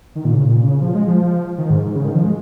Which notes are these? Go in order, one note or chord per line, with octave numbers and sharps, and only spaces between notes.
D#3
A#2
C#3
A#2
C#3
F3
G#3
F3
D#3
G#2
G#2
C#3
D#3
F3
G#3